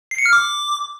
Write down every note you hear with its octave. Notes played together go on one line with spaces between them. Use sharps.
C7
C#7
F6
D6